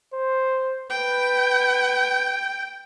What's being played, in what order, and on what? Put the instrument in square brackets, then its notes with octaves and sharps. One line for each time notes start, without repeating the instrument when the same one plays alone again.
[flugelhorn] C5
[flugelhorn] B4 [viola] G5